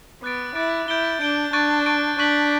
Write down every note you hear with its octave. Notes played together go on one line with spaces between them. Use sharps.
B3 D6 F#6 A6 D7
E4 D6 F#6 A6 D7
E4 G6 D7 G7
D4 G6 D7 G7
D4 C#6 F#6 A6 D7
C#6 F#6 A6 D7
D4 C#6 F#6 B6 F#7